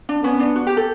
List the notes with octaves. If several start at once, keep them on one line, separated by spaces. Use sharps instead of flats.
D4
B3 C#4
D4
F#4
G4
A4